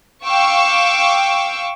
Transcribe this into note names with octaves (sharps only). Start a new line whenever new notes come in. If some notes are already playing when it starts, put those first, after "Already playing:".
F5 G5 C#6 D6 E6